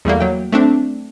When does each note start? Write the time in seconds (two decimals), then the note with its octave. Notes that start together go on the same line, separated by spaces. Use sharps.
0.05 E2 G3 A3 A#3
0.21 F#3 G5
0.52 A3 C4 D4